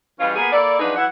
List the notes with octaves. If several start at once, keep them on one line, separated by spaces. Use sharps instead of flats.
E3 G3 G#3 C#4 F4
A#3 B3 F4 G#4
A#3 E4 A4 D5
F3 F#3 D4 D#4 G#4 B4
E3 F#3 E4 F#5